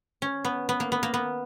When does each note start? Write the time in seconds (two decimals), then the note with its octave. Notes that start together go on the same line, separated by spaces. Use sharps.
0.22 C#4
0.45 B3
0.69 B3
0.80 A#3
0.92 B3
1.03 A#3
1.14 B3